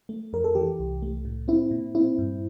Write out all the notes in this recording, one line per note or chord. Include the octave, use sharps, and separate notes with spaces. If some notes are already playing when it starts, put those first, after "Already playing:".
A3
F2 A#4
A4
E3 G4
C2
A3
A2
C4 E4
A#2
C4 E4
G2